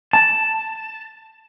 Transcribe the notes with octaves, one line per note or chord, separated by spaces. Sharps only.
A5